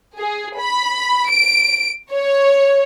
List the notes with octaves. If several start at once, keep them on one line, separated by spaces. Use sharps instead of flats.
G#4
B5
D7
C#5